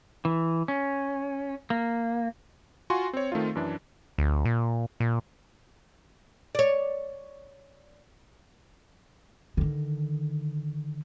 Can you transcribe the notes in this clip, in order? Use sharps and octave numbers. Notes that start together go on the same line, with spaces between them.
E3
C#4
A#3
F4 F#4 G#5 C6 C#6
C4 C#5
D#3 A3 C4 D#4 F4
F#2 E3 D4
D2
A#2
A#2
C#5 D5
D3 D#3